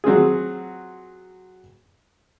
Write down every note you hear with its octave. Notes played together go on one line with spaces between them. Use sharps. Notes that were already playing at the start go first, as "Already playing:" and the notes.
F#3 C4 F4 G#4